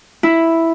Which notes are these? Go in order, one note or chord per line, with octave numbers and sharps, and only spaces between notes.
E4